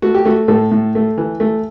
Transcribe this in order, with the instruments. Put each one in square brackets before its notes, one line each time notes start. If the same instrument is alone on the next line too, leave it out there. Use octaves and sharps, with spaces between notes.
[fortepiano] A3 F#4
G4
A3 F#4
A2 A4
A2
A3
E3
A3